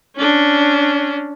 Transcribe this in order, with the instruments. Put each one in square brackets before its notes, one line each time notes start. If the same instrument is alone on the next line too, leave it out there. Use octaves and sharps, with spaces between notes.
[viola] C#4 D4